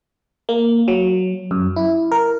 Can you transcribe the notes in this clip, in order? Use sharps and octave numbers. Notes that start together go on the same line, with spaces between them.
A#3
F#3
F#2
E4
A#4